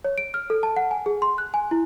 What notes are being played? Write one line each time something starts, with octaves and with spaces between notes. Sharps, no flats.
C#5
D7
F6
A4
A5
F#5
G#5
G#4
C6
F#6
G#5
E4